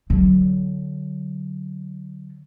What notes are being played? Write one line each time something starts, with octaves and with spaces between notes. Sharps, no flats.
D3 F#3